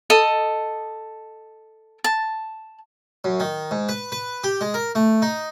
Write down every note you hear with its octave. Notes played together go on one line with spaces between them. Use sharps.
A4 D#5 D#6
A5
F#2
D#3
G#2
B4
B4
G4
G#3
A#4
A3
D#4